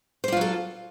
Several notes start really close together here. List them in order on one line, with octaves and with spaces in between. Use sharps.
C5 G3 F4 F#3 A4